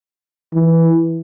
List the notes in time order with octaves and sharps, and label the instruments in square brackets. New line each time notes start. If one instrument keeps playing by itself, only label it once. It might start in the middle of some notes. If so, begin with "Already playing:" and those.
[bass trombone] E3